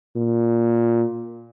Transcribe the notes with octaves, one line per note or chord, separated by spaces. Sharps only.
A#2